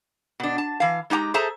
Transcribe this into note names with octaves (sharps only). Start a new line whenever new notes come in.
B2 D4
A5
E3 F5
G#3 D#4 G4 G5 A#5
G#4 A4 C5 E5 A5 A#5